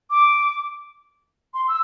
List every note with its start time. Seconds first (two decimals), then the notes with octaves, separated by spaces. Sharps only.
0.11 D6
1.54 C6
1.68 E6